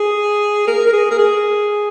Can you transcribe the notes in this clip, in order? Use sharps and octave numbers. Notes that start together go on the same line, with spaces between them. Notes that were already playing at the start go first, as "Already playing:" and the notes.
Already playing: G#4
A#4
A#4
G#4
A#4
G#4